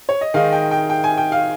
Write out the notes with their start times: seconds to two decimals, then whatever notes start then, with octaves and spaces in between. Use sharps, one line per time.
0.09 C#5
0.21 D#5
0.34 D#3 G#3 D#4 F5
0.53 G5
0.71 G5
0.90 G5
1.04 G#5
1.18 G5
1.32 F5